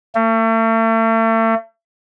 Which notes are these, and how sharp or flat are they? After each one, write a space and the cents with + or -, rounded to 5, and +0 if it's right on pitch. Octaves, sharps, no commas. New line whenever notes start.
A3 +40